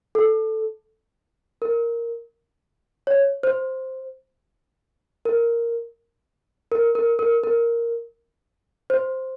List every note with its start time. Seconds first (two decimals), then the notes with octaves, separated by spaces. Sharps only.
0.15 A4
1.62 A#4
3.07 C#5
3.43 C5
5.25 A#4
6.72 A#4
6.95 A#4
7.19 A#4
7.44 A#4
8.90 C5